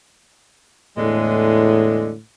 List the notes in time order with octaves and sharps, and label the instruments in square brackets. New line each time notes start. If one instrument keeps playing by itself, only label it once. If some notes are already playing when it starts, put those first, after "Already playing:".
[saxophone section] E2 D3 G#3 [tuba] A2